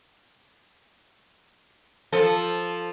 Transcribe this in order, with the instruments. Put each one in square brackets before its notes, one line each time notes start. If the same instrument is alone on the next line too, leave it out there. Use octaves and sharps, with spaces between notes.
[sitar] F3 A4